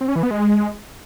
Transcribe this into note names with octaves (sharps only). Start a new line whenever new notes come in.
C4
C#4
E3
B3
G#3